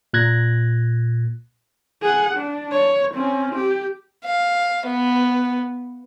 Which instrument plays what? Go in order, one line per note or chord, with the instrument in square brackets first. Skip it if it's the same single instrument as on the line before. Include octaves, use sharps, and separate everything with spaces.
[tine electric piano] A#2 F#6 G#6 A#6
[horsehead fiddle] G#4 F#5
D4
C#5
C4 C#4
G4
[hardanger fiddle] F5
B3